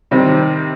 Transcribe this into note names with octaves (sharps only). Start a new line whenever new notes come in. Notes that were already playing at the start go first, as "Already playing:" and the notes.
C3 D#3 G3 C4